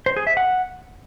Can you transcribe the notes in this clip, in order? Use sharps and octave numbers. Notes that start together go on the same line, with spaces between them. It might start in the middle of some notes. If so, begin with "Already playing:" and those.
C5
G#4
E5
F#5